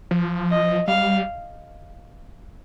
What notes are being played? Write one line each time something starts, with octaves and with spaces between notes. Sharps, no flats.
F3
D#5
G3 F5